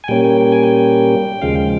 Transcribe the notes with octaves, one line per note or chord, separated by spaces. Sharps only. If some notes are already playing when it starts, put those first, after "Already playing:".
G#5
A#2 G3 A#3 C#4 G5
G5
G5
G#5
G5
D#2 C#3 F3 G#3 F5
G5